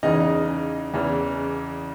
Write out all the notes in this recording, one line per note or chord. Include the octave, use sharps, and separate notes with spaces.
E2 C#3 E3 D#4 D#5
E2 C#3 E3